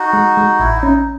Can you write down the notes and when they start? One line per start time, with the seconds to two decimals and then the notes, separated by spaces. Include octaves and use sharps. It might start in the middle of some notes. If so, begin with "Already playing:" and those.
Already playing: D#4 F#4
0.13 G#3
0.37 G#3
0.60 A1 E4
0.77 D#4
0.83 C#4